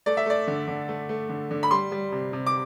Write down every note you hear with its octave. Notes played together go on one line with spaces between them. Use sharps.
A3 D5
E5
A3 D5
D3
D3
A3
A3
D3
D3
B5
G3 C6
G3
C3
C3
D6